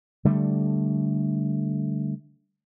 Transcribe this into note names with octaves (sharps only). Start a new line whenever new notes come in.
D3 G3 A3